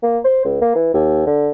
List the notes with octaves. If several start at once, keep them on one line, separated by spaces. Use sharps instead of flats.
A#3
C5
C#2
A#3
E3
D#2
D3